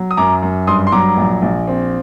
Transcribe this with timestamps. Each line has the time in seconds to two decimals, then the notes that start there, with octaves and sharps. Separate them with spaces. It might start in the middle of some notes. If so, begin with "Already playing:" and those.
Already playing: F#3
0.11 D#6
0.17 F#2 A#5 D6
0.43 F#2
0.67 G2 C6 D#6
0.87 C6
0.92 F#3 A#5 D6
1.17 A#1
1.42 A#1
1.67 C4